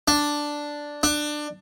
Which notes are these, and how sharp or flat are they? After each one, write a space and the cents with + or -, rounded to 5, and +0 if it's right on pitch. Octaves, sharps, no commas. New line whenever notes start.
D4 +0
D4 +20